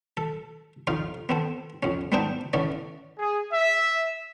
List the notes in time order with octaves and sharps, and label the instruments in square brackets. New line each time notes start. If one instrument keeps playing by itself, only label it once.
[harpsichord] A4
F2 D#4 F4 F5
B3 C4 A4
F2 C#4
G#3 B3 C4 D4 D#4 G5
D3 E3 C#4 D5
[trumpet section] G#4
E5